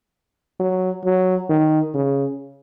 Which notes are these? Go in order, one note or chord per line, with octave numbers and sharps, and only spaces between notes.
F#3
F#3
D#3
C#3